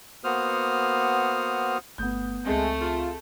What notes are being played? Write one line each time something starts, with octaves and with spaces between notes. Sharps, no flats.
A#3 B3 F#4 C5 D#6 F6
G1 A3 B3 D#6 G6
C#2 G#3 A3 C4
F4 G#4